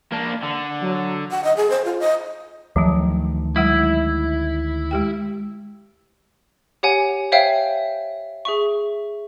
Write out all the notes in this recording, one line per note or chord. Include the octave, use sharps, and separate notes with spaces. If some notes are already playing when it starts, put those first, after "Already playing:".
A#3 D4
D3
F#3
F#5
D#5
G#4
C5
F4
D#5
D2 D#3 F3 F#3 A3
F#3 G#3 E4 F#5
G#3 G4 G5
G4 C#5 F#5 G#5
C5 C#5 E5 F5 G5
G#4 E5 C#6